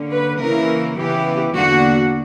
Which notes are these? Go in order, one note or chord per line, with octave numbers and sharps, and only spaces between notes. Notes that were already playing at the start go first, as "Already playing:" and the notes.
Already playing: D3 A#3 C#4
B4
C#3 E3 A#3 C#4 E4 A#4
C#3 E3 B3 E4 G4
E2 D3 A#3 D4 F#4